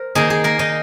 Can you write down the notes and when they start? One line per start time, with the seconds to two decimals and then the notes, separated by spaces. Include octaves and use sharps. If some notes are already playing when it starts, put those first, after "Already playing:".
Already playing: A#4 C5
0.15 D#3 A#3 D#4 G#4
0.30 G#4
0.44 A#3 A#4
0.59 D#4 D#5